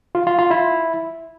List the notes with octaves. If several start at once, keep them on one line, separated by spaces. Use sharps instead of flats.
F4
F4
F4
E4